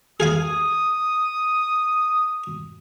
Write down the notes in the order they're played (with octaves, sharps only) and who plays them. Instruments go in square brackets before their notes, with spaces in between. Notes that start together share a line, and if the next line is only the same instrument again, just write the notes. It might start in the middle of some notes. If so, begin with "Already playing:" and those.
[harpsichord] G#4 F5 G#5 [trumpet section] D#6